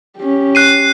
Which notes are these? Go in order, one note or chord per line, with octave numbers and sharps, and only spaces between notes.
C#4 G4
F#6 C7 D#7